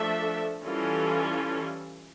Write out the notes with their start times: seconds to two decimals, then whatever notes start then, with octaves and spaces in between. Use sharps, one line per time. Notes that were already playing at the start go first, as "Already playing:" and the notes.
Already playing: F3 A3 D4 A4 E5
0.63 E3 G3 C#4 F4 A4